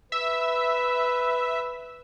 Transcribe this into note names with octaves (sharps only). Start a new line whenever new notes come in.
B4 E5